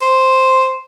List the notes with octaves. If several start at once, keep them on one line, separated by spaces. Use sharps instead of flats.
C5